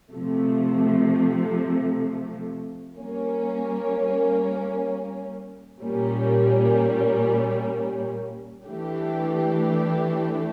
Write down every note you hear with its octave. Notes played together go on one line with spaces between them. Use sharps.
C3 F3 A3
G3 A#3 C#4
A#2 G3 A#3 C#4
E3 A3 D4 G4